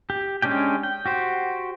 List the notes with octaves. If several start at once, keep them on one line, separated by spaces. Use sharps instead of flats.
G4
G#3 C#4 D4 G4 G5
G5
F#4 G4 C5